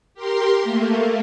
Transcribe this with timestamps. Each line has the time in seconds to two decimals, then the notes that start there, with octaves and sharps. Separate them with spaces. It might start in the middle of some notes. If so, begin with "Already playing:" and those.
0.14 G4 A#4 C6
0.62 A3 A#3